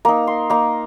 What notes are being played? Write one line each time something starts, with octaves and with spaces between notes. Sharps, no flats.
A#3 D#4 A#5
C6
A#3 D#4 A#5